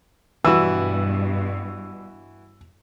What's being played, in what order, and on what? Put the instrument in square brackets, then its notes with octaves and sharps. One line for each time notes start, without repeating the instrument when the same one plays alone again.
[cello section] G2 B2 [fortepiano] E3 F#4 [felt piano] E6